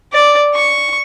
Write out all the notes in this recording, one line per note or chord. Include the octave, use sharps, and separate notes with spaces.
D5
C#6